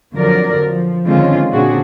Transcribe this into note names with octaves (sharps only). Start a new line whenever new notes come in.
F2 D3 F#3 A#4 D5
F3
D3 D#3 G#3 C4 C#4 F4
A#2 C#3 C4 D4 F#4 G#4